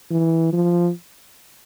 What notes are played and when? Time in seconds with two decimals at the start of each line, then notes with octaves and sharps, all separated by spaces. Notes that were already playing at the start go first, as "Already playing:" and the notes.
0.11 E3
0.53 F3